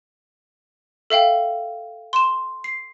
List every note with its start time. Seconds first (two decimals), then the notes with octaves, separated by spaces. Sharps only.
1.10 A4 E5 F5 G5
2.13 C6 E7
2.64 C7